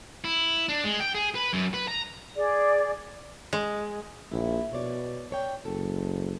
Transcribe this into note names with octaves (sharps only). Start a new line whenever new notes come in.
E4
D4
G#3
G5
G#4
B4
F#2
B4
A#5
G#4 D5
G#3
A#1 E4
B2 C#5 D5
D4 C#5 G5
F#1 A4